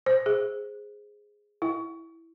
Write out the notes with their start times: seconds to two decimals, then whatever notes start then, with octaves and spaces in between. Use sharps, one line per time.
0.06 C5
0.26 G#4
1.62 E4